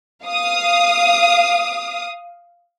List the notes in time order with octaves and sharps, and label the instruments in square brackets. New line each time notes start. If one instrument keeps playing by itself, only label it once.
[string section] F5 D#6